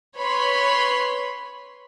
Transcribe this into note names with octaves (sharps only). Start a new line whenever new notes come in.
B4 C#5 B5 C6